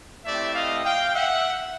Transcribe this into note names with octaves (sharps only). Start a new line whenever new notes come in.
A3 C4 E4 G4 D5 E5
D#5 F5
F5 G5
E5 F#5